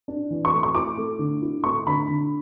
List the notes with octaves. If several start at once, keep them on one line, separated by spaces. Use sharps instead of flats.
D4
E3
C#6
A3
C#6
E4 D6
A3
D3
E4
A3 C#6
D3 B5
D3